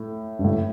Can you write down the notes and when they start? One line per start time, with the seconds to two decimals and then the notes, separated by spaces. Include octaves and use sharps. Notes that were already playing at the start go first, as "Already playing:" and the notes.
Already playing: A2
0.39 G2
0.44 A2